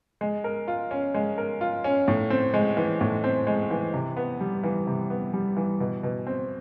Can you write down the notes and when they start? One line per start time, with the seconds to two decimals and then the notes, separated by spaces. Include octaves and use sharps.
0.21 G#3
0.44 A#4
0.68 F4
0.91 C#4
1.14 G#3
1.38 A#4
1.61 F4
1.84 C#4
2.08 A2
2.30 C4
2.54 G#3
2.77 E3
3.01 A2
3.24 C4
3.47 G#3
3.71 E3
3.93 C3
4.17 B3
4.40 G3
4.64 E3
4.87 C3
5.10 B3
5.34 G3
5.57 E3
5.80 B2
6.03 B2
6.27 C4